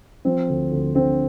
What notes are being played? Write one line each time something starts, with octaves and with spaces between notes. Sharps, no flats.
F3 C4
D2
D2
D3 C4